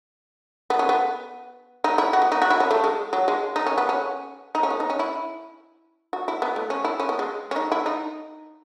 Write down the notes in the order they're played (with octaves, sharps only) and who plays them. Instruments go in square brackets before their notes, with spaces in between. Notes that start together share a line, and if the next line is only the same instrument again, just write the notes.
[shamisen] B3
C#4
B3
D#4
E4
F#4
B3
D#4
F#4
E4
C#4
A3
G#3
F#3
G#3
D#4
C#4
B3
C#4
D#4
C#4
B3
D#4
C#4
E4
F#4
E4
B3
A3
C#4
E4
C#4
B3
G#3
C#4
D#4
E4
D#4